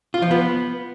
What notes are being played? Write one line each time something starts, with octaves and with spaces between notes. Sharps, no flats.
F4
F3
B3